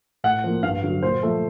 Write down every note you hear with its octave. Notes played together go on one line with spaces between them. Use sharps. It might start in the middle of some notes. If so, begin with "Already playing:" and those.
A2 F#5
F3 A#3
G2 F5
D3 F#3
A#2 C5
F3 A3